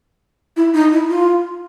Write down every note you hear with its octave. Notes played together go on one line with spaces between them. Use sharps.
E4
D#4
E4
F4